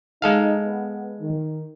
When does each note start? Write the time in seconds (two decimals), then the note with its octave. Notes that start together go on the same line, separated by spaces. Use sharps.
0.22 G#3 D#4 A4 F5
0.65 B3
1.21 D#3